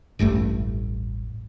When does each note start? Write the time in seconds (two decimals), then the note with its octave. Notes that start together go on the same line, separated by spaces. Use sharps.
0.19 E1 A1 G2 A3